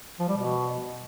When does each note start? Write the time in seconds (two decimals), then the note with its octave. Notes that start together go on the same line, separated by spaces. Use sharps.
0.19 F3
0.28 G3
0.37 B2